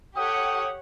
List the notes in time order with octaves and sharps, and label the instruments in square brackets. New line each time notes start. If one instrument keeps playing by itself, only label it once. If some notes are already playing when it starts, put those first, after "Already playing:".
[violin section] G4 C#5 F#5 [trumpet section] A4 G5 D#6